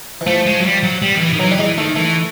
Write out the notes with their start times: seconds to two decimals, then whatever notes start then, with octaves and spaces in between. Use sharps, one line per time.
0.21 E3
0.27 F3 A3
0.46 G#3
0.60 F#3
0.65 G3
0.83 F#3
1.02 G3
1.15 D#3
1.21 E3
1.33 D#3
1.40 E3 F#3
1.52 G3
1.58 E3 G#3
1.77 D#3 A3
1.95 E3 A3